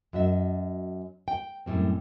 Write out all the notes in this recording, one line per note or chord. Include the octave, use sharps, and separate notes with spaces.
F#2 F#4 D#5 E5
G5
F#2 A2 G3 C4